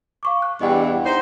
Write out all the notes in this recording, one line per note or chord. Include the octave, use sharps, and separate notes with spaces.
F5 C#6 D6
F#6
E2 G2 D#5 F#5 G5
D#4 C5